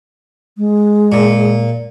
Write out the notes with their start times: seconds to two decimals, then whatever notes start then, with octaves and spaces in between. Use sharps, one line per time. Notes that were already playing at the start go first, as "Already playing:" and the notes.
0.58 G#3
1.12 A#2